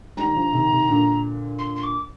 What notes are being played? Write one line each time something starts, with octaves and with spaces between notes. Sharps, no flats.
D#3 G3 A#5
D3 F3
C3 D#3
C3 D#3
A#2 D3
C6
C6
D6